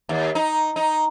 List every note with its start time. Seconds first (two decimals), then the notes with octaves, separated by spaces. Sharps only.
0.09 D#2
0.35 D#4
0.76 D#4